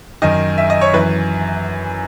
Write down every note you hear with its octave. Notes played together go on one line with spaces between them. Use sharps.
F#2 D#3 D#5
E5
D#5
C#5
F#2 E3 B4